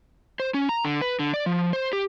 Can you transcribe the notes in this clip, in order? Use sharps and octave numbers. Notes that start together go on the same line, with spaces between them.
C5
C#4
A#5
D3
B4
D3
D5
F3
C5
G4